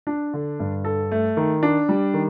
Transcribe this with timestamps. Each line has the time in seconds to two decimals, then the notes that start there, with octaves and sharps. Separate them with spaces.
0.07 D4
0.34 D3
0.60 G2
0.85 A4
1.11 A3
1.37 D#3
1.63 D4
1.89 G3
2.14 D#3